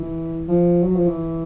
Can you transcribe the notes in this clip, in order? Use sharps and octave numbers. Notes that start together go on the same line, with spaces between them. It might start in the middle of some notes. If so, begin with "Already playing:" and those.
Already playing: E3
F3
F#3
F3
E3